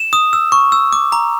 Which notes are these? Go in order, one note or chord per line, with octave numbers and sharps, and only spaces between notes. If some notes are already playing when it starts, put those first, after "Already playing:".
Already playing: E7
D#6
E6
C#6
E6
D6
A#5